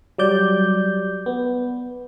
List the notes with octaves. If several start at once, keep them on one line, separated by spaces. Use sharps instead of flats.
F#3 G3 D5 G6
B3